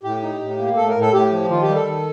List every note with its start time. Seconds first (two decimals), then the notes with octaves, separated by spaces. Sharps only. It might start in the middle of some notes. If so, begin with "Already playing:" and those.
0.03 A2 G4
0.23 D#4
0.41 A2
0.58 A#3
0.76 A2 A4
0.89 A#4
0.96 A2
1.01 A4
1.13 A2 G4
1.31 F3
1.50 D#3 F4
1.62 G4
1.69 G3
1.75 A4
1.87 D#3